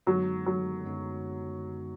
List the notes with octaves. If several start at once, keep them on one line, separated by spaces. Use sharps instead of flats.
F#2 D3 F#3 G#3 B3 D#4
F#3
F#2 D3 G#3 B3 D#4